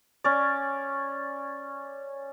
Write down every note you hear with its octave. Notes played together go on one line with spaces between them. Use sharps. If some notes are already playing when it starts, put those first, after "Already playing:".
C#4 D5